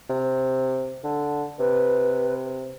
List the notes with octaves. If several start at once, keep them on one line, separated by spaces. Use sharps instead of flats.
C3
D3
C3 B4